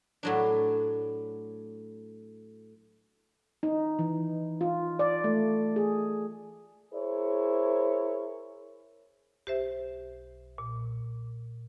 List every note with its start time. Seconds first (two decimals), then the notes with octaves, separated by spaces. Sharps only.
0.23 A2 F#3 D4
3.63 D#4
3.99 E3
4.61 F4
4.99 D5
5.24 A3
5.76 G#4
6.94 E4 G#4 A#4 C5 C#5
9.47 B1 G4 C5 E5
10.58 A#2